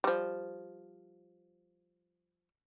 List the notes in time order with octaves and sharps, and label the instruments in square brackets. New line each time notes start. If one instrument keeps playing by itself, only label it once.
[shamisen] F3 G3